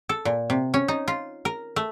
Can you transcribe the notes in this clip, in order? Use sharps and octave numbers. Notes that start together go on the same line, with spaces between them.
A4
A#2
C3
C#4
D#4
F4
A#4
A3